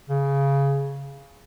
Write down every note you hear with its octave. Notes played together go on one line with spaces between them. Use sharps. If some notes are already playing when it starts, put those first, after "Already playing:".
C#3